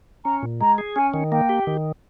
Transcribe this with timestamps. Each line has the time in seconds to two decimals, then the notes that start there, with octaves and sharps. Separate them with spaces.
0.25 C#4 A#5
0.43 A#2
0.61 G#3 A#5
0.78 G#4
0.96 C#4 G#5
1.14 D#3
1.31 A#3 G5
1.49 G4
1.67 D#3